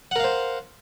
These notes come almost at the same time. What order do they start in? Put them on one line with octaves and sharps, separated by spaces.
F#5 A#4 F5 C5